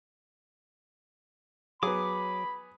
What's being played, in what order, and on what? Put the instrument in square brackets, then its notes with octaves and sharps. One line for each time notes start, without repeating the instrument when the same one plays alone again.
[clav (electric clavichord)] F#3 [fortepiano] B3 G#4 [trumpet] B5 [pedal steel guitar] D6